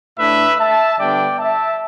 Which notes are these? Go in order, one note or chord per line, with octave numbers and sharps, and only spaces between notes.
A2 A3 D4 B4 E5
E5 A5
D3 G3 B3 D4 D5 G5
E5 A5